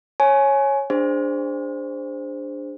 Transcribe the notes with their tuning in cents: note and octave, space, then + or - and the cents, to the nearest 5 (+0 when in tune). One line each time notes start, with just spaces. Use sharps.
C#5 -15 G#5 +20
D4 +0 G#4 -20 C5 +0